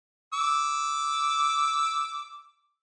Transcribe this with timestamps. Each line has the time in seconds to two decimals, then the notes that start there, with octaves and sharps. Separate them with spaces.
0.33 D6 E6